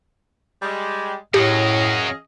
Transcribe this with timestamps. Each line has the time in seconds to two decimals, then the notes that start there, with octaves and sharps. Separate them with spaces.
0.62 G3 G#3
1.34 F#2 A2 F#3 G4 G#4 D#5 F5